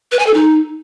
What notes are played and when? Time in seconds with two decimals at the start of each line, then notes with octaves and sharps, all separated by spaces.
0.12 B4
0.19 G#5
0.27 A4
0.34 D#4